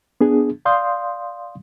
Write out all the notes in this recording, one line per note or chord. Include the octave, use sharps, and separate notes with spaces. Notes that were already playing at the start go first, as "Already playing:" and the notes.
B3 D4 G#4
D5 F5 C6 D#6 G6